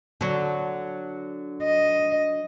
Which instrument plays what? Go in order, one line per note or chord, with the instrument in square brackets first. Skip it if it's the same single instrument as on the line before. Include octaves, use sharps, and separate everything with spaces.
[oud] D3 F#3
[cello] D#5